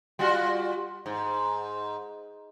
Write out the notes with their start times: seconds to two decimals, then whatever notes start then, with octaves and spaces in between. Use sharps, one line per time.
0.19 G3 F4 F#4
1.06 G#2